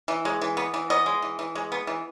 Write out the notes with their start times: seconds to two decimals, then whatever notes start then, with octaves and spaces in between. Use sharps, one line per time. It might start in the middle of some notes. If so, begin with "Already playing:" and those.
0.08 E3
0.25 G#3
0.41 E3
0.57 B3
0.74 E3
0.90 B3 D#5
1.06 G#3
1.22 E3
1.39 E3
1.55 G#3
1.72 B3
1.87 E3